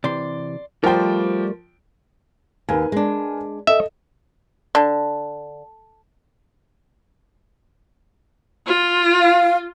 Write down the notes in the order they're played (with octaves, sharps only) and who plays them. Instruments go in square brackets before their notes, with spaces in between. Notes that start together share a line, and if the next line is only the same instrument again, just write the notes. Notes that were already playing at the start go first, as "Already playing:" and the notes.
[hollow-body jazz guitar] C3 E3 [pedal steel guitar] D5 C6
[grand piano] F3 G5 [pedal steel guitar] G3 A3 D5 [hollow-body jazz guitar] A#4 C5
[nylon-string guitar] D#2 [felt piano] A#4 B4 G#5
[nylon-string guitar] G#3 D4
[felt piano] A4 D#5 [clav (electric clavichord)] E5
[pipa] D3
[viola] F4
[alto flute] F5